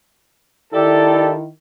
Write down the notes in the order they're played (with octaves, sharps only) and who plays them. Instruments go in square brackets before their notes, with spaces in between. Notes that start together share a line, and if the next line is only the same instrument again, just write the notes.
[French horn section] D#3 E4 [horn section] G4 A4 [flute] D5